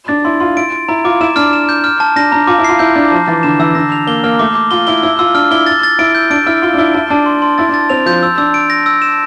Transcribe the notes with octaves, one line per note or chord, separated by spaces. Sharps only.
D4 A6
E4 C6
F4 C6
E4 D7
D7
E4 A#5
F4 D6
E4 E7
D4 F6
E7
G6
F6
A5
D4 A#6
D4 A#5
F4 D6
E4
F4 C7
E4 G6
D4 G6
F3 A5
E3 A6
D3 E7
E3 E6
D3 A#6
F7
A#3 G7
A#3 F6
A3 D6
D6
F4 G7
E4 G7
E4 E6
F4 E6
D4 F6
E4 G7
A6
A6
E4 D7
G6
D4 D7
E4 F6
F4 G7
D4
E4 G7
E4 A5
D4 A5
C6
C6
E4 A6
D4
A6
C4 F7
F3 G6
E6
D4 E6
D7
A#6
E6
E7